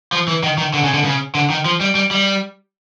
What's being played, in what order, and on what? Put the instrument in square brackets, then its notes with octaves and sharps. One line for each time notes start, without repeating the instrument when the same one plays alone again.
[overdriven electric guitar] F3
E3
D#3
D#3
D3
C#3
D3
C#3
D3
D#3
F3
G3
G3
G3